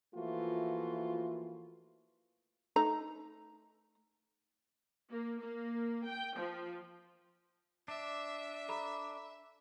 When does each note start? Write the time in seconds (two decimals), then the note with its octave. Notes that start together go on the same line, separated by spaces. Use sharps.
0.15 E3 F3 A3 A#3 F4 F#4
2.76 A3 D#4 A#5
5.10 A#3
5.40 A#3
6.06 G5
6.37 F3
7.88 D4 E5
8.68 A4 A#5 B5